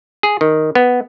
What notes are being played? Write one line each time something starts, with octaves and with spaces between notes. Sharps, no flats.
G#4
D#3
B3